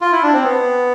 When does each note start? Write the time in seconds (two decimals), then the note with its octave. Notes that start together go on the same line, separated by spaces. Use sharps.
0.01 F4
0.12 E4
0.23 D4
0.33 C4
0.44 B3